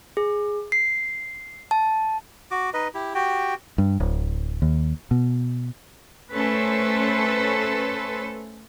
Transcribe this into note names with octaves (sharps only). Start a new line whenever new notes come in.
G#4
C7
A5
F#4 D6
D#4 B4 D#5
E4 G4
F#4 G4 G5
G2
D1
D#2
B2
A3 C#4 A4 B4 C5